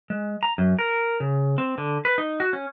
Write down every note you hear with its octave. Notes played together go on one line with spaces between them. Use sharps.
G#3
A#5
F#2
A#4
C#3
C4
D3
B4
D#4
F#4
C#4